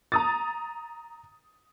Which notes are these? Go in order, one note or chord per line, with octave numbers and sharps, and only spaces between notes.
A#5 D#6 A6